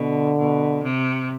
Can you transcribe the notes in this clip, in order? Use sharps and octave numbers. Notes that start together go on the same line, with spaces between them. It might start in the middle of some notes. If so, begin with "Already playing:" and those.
Already playing: B2 D3
B2
C3